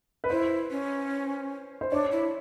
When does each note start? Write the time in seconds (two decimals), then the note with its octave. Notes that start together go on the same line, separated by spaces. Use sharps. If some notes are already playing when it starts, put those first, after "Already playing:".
0.24 B4
0.30 E4 C5
0.71 C#4
1.81 C5
1.92 D4 C#5
2.12 E4